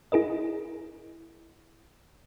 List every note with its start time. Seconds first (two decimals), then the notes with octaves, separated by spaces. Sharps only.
0.12 E4 G#4 A#4 D#5